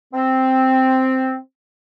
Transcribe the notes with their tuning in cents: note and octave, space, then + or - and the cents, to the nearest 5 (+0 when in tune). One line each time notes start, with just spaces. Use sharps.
C4 +0